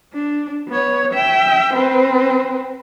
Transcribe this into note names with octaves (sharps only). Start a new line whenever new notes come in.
D4
B3 C#5
E5 G5
C4 B4